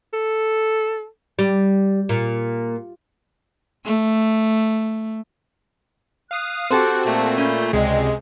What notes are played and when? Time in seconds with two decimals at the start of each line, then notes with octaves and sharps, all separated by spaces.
0.13 A4
1.39 G3
2.09 A#2
3.85 A3
6.31 F5 D#6 F#6 C7
6.71 C4 F#4 G4 A4 C5 F#6
7.05 A#2 A3 A5
7.38 C#4 B5 G6
7.73 C#2 C3 G#3 D5 D#5 G5